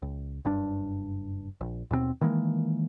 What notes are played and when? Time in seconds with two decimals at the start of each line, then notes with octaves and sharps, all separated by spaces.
0.02 C#2
0.45 F#1 G2 D4
1.61 A#1
1.91 D#2 B2 G3 C4
2.21 D#3 E3 G#3 A#3